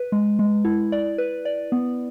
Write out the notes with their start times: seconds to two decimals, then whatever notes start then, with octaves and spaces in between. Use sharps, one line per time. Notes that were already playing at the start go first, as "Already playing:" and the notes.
Already playing: B4
0.12 G#3
0.39 G#3
0.65 E4
0.92 D5
1.18 B4
1.45 D5
1.72 B3